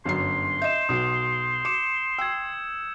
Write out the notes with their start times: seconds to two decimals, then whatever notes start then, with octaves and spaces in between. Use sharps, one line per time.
0.05 G1 F#2 C6 C7
0.62 D#5 E5 G6 E7
0.89 B1 B2 D#6
1.65 D6 C#7 E7
2.18 G5 E6 G#6